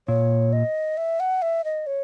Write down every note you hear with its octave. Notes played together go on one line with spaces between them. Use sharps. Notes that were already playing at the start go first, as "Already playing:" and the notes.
A#2 C#5
D#5
E5
F#5
E5
D#5
C#5